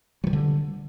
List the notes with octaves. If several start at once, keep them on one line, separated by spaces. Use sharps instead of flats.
D3 E3 F#3 G3